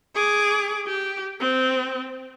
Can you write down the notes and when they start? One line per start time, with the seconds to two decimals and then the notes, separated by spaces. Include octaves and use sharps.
0.15 G#4 D6
0.87 G4
1.40 C4